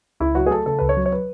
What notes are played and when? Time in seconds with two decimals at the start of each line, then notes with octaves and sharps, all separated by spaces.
0.20 C#2 E4
0.35 F#3 F#4
0.46 G#4
0.51 A3 A4
0.66 C#3 A4
0.79 C#2 B4
0.89 C#5
0.97 F#3
1.06 C#5
1.12 B4